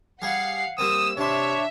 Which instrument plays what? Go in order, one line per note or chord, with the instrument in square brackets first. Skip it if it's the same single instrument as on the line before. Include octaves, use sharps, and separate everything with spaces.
[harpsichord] G3 G#4 [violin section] F5 F#5 C7
[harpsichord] G3 A#3 C4 [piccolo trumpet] D#6 [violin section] E6
[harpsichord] C3 C6 [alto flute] D4 [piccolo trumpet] C#5 [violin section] E5